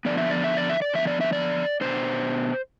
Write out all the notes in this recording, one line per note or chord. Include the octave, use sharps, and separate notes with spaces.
D3 F3 B3 D5
E5
D5
E5
D5
E5
D5
D3 F3 B3 E5
D5
E5
D5
B2 B3 D4 C5